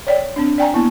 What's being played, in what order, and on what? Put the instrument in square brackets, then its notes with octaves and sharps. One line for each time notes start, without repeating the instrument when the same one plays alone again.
[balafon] C#5 D5 G5
C4 D4
D5 G5 G#5 A#5
A#3 B3 E4